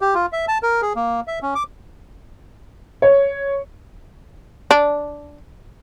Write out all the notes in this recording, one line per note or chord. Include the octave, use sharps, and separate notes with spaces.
G4
F4
E5
A5
A#4
G#4
A#3
E5
C#4
D6
C#5
D4